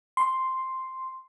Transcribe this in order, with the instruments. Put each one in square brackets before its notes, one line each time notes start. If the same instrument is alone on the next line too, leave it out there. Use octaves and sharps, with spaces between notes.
[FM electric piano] C6